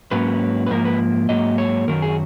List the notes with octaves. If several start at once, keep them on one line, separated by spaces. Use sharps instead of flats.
G#2 F#3 A#3 C#4 B4
B4
G#2 F3 A#3 A#4
B4
G#2 F#3 A#3 D#5
C#5
F#2 D#3 F#3 A#4
G#4